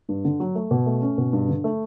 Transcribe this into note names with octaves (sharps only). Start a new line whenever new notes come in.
G2
D3
F#3
A3
B2
A3
C#4
B2
G2
D3
A3